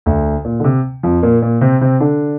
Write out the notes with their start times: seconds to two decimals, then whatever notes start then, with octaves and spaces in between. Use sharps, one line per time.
0.06 D2 D3
0.45 A#2
0.60 D3
0.64 C3
1.03 F2 F3
1.23 A#2 A#3
1.42 A#2 A#3
1.61 C3 C4
1.81 C3 C4
2.00 D3 D4